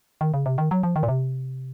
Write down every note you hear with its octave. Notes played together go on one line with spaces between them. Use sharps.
D#3
C#3
C3
D#3
F#3
F3
D#3
A#2
C3